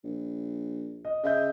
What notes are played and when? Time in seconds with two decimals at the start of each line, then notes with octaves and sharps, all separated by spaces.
0.04 A#1
1.05 D#5
1.24 C#3 D#5 E5 G6